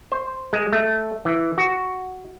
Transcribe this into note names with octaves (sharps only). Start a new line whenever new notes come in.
C5
G#3
A3
E3
F#4